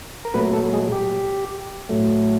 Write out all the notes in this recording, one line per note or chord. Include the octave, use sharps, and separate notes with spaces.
A#4
A#2 F#3 A3 B3 B4
A3 A4
G#3 G#4
G4
A2 F#3 A3